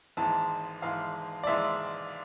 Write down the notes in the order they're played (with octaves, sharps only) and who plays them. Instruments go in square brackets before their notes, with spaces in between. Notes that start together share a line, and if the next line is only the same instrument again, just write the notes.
[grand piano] G#1 G#2 E3 G#3 A5
G#1 G#2 E3 G#3 F5
D5
G#1 G#2 E3 G#3 E5